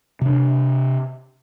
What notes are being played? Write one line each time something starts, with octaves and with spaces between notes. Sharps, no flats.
C3 D4